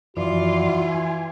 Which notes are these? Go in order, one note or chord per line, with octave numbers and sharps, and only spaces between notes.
F#2 E3 F3 F4 F#4 D5
G#5